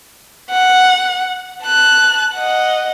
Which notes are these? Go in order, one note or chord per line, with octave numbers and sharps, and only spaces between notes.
F#5
A5 F#6
D#5 F#5